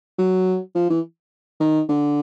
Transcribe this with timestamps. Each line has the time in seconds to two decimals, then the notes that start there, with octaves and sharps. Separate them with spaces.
0.18 F#3
0.75 F3
0.90 E3
1.60 D#3
1.89 D3